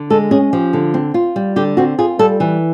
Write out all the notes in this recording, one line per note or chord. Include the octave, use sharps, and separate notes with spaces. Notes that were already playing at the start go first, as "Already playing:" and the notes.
Already playing: D3
G#3 A4
C#4 G#4
F3 G4
D3
C4
F4
G3
D3 G4
C4 F#4
F4 G#4
G3 A4
E3